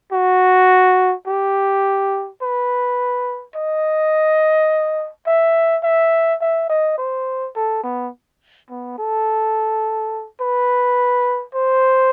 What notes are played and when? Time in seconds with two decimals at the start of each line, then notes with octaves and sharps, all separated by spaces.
0.12 F#4
1.27 G4
2.42 B4
3.55 D#5
5.27 E5
5.83 E5
6.41 E5
6.69 D#5
6.98 C5
7.56 A4
7.83 B3
8.70 B3
8.98 A4
10.41 B4
11.55 C5